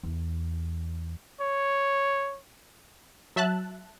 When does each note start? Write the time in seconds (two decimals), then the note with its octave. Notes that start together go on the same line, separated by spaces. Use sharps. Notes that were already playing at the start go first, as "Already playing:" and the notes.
0.03 E2
1.40 C#5
3.36 F#3 E5 A5 F#6